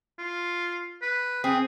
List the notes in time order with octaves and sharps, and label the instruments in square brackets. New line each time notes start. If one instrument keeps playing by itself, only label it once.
[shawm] F4
B4
[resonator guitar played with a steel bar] C4 [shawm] G#4